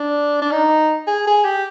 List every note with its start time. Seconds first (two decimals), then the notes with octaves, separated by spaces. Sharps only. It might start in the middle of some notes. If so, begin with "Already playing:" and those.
Already playing: D4
0.42 D4
0.52 D#4
1.07 G#4
1.27 G#4
1.45 G4